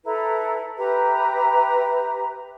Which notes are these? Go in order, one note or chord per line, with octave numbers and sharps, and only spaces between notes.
E4 A4 B4 A#5
G4 B4 E5 A#5